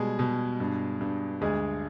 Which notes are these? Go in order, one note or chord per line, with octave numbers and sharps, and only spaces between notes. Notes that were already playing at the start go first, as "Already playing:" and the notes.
Already playing: B2 G3 G#3 G#4
B2
G2
G2
D2 G#3 G#4